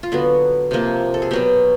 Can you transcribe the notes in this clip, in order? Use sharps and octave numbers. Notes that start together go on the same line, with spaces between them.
F4
D3 F#3 B3 F#4
C3 F3 A#3
A4
G#4
B2 F#3 B3 G4